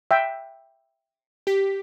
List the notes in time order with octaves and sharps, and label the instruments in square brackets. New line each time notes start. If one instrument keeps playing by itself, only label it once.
[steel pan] E5 G5
[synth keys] G4 B6